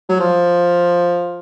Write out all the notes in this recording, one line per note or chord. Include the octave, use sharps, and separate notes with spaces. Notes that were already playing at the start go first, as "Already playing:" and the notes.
F#3
F3